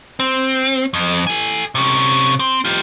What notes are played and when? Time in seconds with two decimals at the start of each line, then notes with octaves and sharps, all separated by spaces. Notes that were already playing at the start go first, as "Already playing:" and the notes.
0.20 C4
0.94 F2
1.27 A4 G#5
1.75 C3 C#4
2.40 C4
2.65 F4 G4